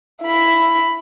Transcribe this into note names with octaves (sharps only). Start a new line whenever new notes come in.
E4 B5